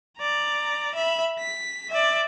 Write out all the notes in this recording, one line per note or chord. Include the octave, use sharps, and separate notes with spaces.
D5 A#5
E5 B5
B6
D5 E5